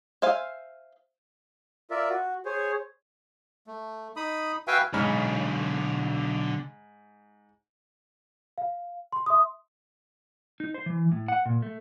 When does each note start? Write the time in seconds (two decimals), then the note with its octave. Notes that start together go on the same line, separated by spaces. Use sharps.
0.22 C5 E5 F5 G#5
1.91 F4 A#4 D5 E5
2.09 F#4
2.46 G#4 C5 C#5
3.67 A3
4.16 D#4 B5 D#6
4.68 F#4 B4 E5 F5 G5 G#5
4.94 B1 G#2 D3 C#5 B5 F6
8.58 F5
9.13 C6
9.26 E5 C6 D#6
10.60 D#4
10.74 C5
10.86 E3
11.12 A2
11.28 F#5
11.46 A#2
11.62 A3